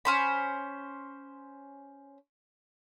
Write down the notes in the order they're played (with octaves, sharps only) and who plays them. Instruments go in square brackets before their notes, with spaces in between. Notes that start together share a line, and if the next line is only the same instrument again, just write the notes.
[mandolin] C#4 C5 B5